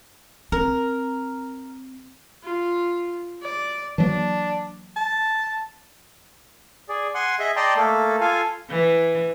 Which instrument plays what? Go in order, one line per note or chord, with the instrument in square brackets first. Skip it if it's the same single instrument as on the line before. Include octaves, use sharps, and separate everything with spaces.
[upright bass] C4 [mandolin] A#4
[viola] F4
D5
[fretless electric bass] E3 F#3 A#3 [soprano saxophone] D4
[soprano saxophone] A5
[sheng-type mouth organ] G#4 D5
F#5 G#5 C6
G#4 D#5 E5
D5 D#5 G5 A5 A#5 C6
A3 A#3 A4
F4 A4 F5 G#5
[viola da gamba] E3